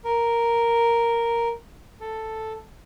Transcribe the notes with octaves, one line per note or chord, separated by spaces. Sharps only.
A#4
A4